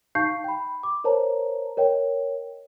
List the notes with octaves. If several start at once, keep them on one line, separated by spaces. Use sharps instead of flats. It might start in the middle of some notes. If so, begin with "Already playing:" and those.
D#4 F5 A5 C#6 G6 C7
G5 B5
D6
A#4 C5 C#5 A5 A#5
A#4 C#5 D#5 G5